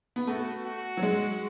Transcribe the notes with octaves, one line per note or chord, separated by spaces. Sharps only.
B3
A3 F#4
F#4
F#3
G#3